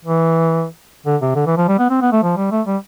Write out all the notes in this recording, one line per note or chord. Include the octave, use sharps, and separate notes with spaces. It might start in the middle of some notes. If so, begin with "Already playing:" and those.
E3
D3
C3
D3
E3
F3
G3
B3
C4
B3
A3
F3
G3
A3
G3